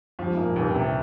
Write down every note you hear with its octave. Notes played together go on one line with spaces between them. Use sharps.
G2 F3
F2 G#2
A#3
G2 A#2
C#2 G#2 C3
G2
C3